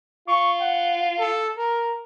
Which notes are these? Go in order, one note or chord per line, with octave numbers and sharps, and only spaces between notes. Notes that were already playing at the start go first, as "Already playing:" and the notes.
F4 C#6
F#5
A4
A#4